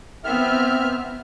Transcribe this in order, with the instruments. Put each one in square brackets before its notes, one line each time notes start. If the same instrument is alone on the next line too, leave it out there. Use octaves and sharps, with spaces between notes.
[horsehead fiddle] B3 [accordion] C4 E5 F6